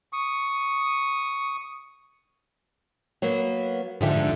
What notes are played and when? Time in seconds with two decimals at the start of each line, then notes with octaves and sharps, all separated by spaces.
0.13 C#6 D#6
3.22 F#3 A#3 B3
4.01 G#2 D3 F3 G4 E5